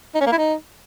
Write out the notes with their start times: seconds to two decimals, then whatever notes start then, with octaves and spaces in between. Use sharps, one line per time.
0.15 D#4
0.21 C#4
0.26 A#3
0.32 E4
0.38 D#4